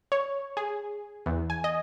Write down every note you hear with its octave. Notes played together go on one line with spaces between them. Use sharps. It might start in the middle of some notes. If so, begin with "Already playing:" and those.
C#5
G#4
E2
G#5
D#5